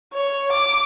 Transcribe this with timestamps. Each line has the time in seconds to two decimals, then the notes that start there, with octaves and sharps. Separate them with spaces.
0.13 C#5
0.53 D6